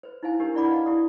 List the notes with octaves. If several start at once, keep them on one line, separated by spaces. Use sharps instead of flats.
B4 C5
D#4 E4 C5 F5 G#5
D4 G4 A#4 C5
D4 E4 D5 F#5 B5 D6
B4 D#5 F5 A5
E4 G4 D5 D#6